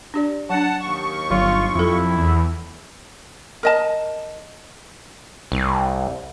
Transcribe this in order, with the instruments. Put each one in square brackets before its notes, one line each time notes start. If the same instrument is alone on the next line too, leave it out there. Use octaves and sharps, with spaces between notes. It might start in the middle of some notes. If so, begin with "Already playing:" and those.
[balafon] D4 G4 D5
[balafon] F#3 D4 [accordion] F#5 A5
[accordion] D#2 C#6
[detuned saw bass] G1 [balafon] F#3 [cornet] F4
[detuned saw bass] F2 [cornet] E4 [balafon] F4 A4
[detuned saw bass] E2
[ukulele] A#4 D#5 A5
[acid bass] C2